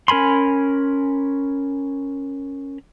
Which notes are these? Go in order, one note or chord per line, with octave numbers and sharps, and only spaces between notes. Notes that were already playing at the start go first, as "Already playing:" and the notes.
C#4 A#4 G#5 B5 C6